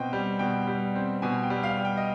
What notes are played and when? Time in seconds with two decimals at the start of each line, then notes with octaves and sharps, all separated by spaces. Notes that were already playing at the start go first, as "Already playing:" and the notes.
Already playing: B2 C4 D#5 G5
0.13 G3
0.39 B2 G5
0.67 G3
0.95 C4
1.22 B2 G#5
1.43 G5
1.50 G3
1.63 F5
1.77 G3
1.85 G5
1.97 D#5